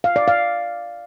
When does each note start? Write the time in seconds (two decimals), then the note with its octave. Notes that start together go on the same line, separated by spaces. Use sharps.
0.04 F5
0.16 D5
0.28 F5